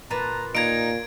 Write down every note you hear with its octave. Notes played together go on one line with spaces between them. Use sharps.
A#2 B4 A5 A#5
A#2 D#4 F5 A#5 G#6 D7